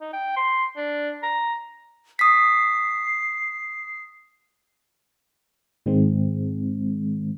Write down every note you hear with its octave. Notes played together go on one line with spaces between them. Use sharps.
D#4
G5
C6
D4
A#5
D#6 B6 C7
G#2 D#3 G#3 C4